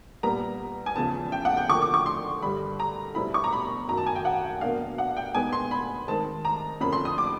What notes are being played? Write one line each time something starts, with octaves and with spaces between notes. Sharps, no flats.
A#2 G3 B3 A#5
G#5
E2 C#3 F3 A5
G5
F#5
G5
D3 F3 A#3 C#6
D6
C#6
C6
G2 D3 G3 B5
A#5
E2 B2 G3 C4 E4 B5
C#6
A#5
B5
F#2 D#3 F#3 A#5
A5
G#5
G5
F#5
B2 F#3 A#3 D4 F5
F#5
G5
B2 G#3 B3 D#4 G#5
C6
B5
D#3 G#3 C4 A5
A#5
F2 D3 F3 A#3 C#4 B5
C6
D#6
D6